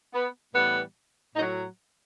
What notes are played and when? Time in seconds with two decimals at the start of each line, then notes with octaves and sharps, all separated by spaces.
0.14 B3
0.54 A2 E3 G3 B3
1.36 A2 D#4
1.40 F#3